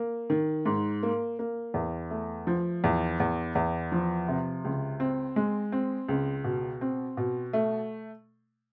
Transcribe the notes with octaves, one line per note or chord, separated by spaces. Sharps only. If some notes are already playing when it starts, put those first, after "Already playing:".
Already playing: A#3
D#3
G#2
A#3
A#3
E2
A3
F3
E2
E2
E2
F3
C3
C#2
C4
G#3
C4
C#2
B2
C4
B2
A3